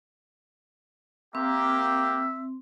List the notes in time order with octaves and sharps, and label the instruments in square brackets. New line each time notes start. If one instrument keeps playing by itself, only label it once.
[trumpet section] A#3 G4 [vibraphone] C4 [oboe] E5